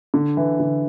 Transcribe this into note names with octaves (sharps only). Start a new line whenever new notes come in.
D3
E3
D3